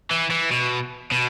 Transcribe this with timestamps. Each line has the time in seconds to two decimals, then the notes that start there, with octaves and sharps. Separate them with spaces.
0.11 E3
0.31 E3
0.51 B2
1.12 B2